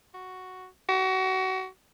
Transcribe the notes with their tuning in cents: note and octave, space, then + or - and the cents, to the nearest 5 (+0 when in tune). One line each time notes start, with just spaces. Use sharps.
F#4 +0
F#4 +30